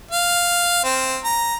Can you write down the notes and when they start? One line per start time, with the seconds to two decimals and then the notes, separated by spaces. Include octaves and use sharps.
0.11 F5
0.84 C4
1.24 A#5